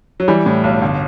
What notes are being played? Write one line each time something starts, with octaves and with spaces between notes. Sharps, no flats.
F#3
E3 G3
A2
B1
G1